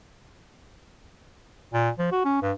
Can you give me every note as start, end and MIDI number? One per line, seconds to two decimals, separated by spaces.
1.73 1.90 46
1.98 2.10 53
2.12 2.23 66
2.25 2.38 61
2.42 2.52 43